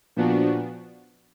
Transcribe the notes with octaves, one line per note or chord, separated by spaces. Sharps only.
A#2 F3 B3 D4 F#4